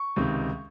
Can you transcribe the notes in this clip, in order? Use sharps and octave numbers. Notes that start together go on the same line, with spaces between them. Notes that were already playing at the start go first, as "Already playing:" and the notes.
Already playing: C#6
C#2 C3 D#3